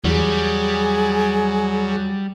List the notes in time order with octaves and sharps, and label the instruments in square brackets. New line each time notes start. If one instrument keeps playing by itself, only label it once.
[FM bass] E2 [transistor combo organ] F#3 [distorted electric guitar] G3 [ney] G#4